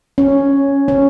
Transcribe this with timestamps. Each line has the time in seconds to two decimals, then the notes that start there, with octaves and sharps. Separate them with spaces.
0.18 C#4
0.88 C#4